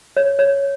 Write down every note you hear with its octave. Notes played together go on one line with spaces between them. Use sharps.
C#5
C#5